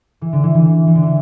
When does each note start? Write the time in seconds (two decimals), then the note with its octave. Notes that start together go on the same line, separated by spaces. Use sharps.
0.21 E3
0.33 D3
0.43 E3
0.55 E3
0.87 E3
0.95 D3
1.03 E3